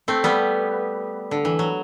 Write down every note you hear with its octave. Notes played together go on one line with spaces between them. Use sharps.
A3 C4
G3 B3
D3
E3
F#3